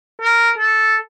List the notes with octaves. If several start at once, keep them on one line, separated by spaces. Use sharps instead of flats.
A#4
A4